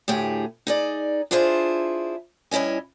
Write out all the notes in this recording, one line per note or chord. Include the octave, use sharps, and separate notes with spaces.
D2 A2 G4 G#4
D#4 G#4 D5
D4 E4 F4 G#4 C5
G2 C#4 E4 D#5 G#5